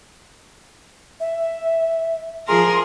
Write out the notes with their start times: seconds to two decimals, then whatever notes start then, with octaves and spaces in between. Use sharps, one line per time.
1.20 E5
2.48 F3 G#4 A#4 C6